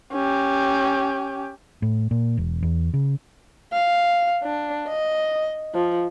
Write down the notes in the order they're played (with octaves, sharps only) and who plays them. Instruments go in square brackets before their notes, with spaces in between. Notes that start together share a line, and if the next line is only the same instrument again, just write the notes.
[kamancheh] C#4 G4
[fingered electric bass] A2
A#2
E1
E2
C#3
[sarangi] F5
D4
D#5
F3